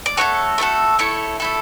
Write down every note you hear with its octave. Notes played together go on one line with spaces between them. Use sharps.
D5
A3 D4 F#4 A4 C#5
A3 D4 F#4 A4
A3 E4 A4 C#5
A3 E4 A4